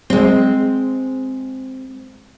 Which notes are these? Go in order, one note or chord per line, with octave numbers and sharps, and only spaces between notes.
G#3 C4